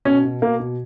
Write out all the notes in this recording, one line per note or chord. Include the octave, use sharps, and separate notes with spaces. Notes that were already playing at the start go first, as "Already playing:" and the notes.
B2 C#4
B2
B2 A#3
B2